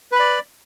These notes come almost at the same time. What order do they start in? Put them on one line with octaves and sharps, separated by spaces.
B4 B5 D5